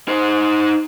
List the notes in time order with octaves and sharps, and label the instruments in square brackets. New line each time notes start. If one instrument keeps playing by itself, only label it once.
[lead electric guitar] D#4 C5